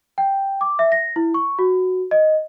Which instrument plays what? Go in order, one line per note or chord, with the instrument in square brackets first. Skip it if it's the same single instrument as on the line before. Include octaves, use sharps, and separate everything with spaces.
[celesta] G5
D6
E5
A#6
E4
C#6
F#4
D#5